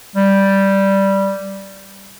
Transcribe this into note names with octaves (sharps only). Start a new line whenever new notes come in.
G3